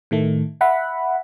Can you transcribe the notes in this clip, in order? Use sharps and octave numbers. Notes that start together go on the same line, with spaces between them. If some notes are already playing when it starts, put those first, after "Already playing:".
A2 D#3 A3
E5 F#5 B5